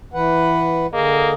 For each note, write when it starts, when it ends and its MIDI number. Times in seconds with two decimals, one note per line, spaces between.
0.14 0.87 52
0.14 0.87 71
0.14 0.87 78
0.93 1.34 50
0.93 1.33 58
0.93 1.34 68
0.93 1.34 75